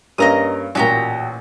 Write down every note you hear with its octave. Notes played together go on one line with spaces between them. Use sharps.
G2 A#3 C#4 D#5 A#5 D#6
A1 A#2 F#4 G4 A#5